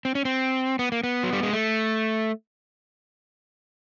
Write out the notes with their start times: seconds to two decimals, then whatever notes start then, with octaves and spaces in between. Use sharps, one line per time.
0.05 C4
0.15 C#4
0.25 C4
0.79 B3
0.92 A#3
1.04 B3
1.23 F#3
1.33 G3
1.43 G#3
1.53 A3